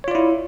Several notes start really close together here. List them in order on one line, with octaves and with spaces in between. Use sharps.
C#5 F4 D5 E4